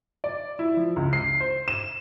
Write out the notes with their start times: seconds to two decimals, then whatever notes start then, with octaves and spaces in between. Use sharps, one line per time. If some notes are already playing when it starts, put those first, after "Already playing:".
0.24 D5
0.59 E4
0.77 F3
0.96 C#2
1.13 C7
1.40 C5
1.68 E7